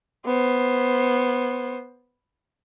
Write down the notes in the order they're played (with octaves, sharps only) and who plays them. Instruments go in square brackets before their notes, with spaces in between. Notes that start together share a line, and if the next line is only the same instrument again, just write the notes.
[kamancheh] B3 C5